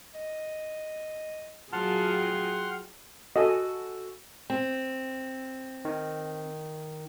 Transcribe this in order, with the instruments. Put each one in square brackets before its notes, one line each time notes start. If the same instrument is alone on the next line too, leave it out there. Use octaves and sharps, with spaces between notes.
[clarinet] D#5
[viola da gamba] F#3 F4 G#4 [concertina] F#5 C6 F6 [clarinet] A5
[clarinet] G5
[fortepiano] F#4 A4 G#5 [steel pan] D#5
[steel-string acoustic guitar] C4
[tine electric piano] D#3